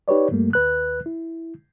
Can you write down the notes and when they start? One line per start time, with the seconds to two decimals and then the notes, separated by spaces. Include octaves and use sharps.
0.08 D#4 G4 B4 C#5 D5
0.31 G2 G3 A3 A#3
0.53 D#2 B4 F#6
1.06 E4